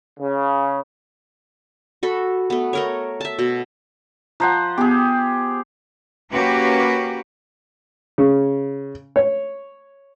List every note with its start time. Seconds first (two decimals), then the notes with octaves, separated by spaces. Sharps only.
0.20 C#3
2.03 F#4 A4 B5
2.50 A3 B3
2.73 A3 A#4 C#5
3.21 E5 A5
3.39 B2
4.40 F3 C5 F#5 A#5
4.78 B3 G4 G#4
6.33 A#3 C#4 F#4 G4 B4
8.18 C#3
9.16 C#5